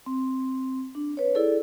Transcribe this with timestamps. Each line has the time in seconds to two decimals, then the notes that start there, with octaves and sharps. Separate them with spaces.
0.06 C4
0.95 D4
1.17 B4 C#5
1.35 E4 G#4 A4 D5